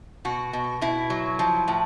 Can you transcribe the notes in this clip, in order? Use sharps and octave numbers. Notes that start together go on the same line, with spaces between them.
B2 F#4
B2
B2 E4
F#3
F3
A2